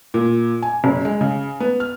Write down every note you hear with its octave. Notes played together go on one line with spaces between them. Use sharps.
A#2
G#5
F#1
G#3
C#3
B3
F6